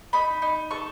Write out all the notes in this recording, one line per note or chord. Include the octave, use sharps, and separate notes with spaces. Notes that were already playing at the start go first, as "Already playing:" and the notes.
D#4 B5
D#4
A4 C#6